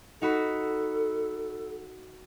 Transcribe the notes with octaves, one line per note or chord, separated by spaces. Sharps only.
D#4 F#4 A4 B5